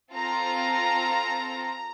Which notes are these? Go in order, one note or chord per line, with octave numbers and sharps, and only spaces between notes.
C4 F4 A4 A#5